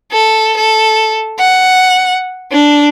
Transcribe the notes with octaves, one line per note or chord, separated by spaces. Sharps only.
A4
A4
F#5
D4